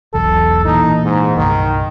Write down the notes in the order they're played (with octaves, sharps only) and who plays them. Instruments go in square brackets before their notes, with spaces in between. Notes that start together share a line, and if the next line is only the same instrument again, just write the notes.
[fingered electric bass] E1 B1 E2 [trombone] A4
[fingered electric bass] A#2 E3 [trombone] D#4
[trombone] G#2
[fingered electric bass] C2 G2 [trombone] D#3